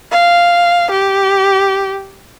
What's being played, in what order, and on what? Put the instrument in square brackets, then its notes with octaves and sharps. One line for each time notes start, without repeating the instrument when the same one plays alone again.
[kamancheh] F5
G4